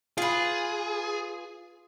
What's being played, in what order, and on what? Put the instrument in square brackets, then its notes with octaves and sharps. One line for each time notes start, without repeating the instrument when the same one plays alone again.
[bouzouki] F4 B4 [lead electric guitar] G#4